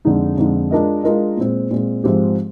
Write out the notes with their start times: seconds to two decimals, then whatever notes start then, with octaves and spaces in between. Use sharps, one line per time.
0.05 F2 D3 G#3 D#4
0.38 F2 D3 G#3 D#4
0.71 G#3 D4 F4 A#4 D#5
1.04 G#3 D4 F4 A#4 D#5
1.37 A#2 G#3 C4
1.71 A#2 G#3 C4
2.04 G#2 F3 C4 G4